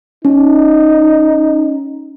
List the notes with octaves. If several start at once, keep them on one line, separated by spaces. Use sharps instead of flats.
C#4 D#4